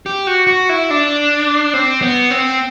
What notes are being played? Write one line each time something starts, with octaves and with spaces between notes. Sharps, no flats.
G4
F#4
F#4
E4
D4
C4
B3
C4